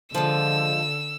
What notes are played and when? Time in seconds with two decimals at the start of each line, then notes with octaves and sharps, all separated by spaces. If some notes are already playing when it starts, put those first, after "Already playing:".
0.14 D3 F3 G#3 E6